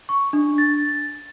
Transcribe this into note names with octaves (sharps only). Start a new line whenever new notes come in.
C#6
D4
A6